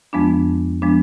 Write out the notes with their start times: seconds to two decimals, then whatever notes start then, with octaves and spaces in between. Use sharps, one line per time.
0.13 F2 F3 G#3 B3 D4
0.82 F3 G#3 B3 D4